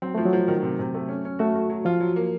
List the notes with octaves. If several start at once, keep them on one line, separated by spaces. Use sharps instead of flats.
F#3 C4
F3 A3
F#3
F3
D#3
C3
C3
A3
C#4
C#4
A3 F#4
F#4
F#3
F3 F4
F#3
A#3